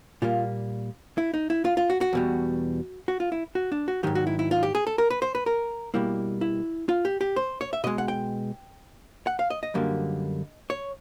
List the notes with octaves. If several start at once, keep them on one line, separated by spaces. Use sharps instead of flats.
A#2 G3 A#3 F4
E4
D#4
E4
F4
F4
F#4
F#4
E2 B2 G3
F#4
F4
E4
F#4
D4
F#4
G#2 D#3 F#3 G4
F#4
E4
E4
F4
G4
G#4
A4
A#4
B4
C5
B4
A#4
B2 G3 A#3 E4
E4
F4
G4
G4
C5
C#5
E5
B2 G#3 D#5
F#5
G5
F#5
F5
D#5
D#5
F#2 D3 G3 A#3
C#5